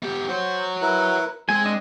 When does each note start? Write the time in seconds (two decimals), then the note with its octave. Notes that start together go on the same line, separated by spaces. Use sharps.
0.02 B3 G4
0.29 F#4 C5 C#5
0.81 E4 A#4 B4
1.49 G#3 C4 G#4 G#5
1.65 D4 D#5